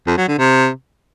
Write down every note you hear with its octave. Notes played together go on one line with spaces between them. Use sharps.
F2
F#3
D3
C3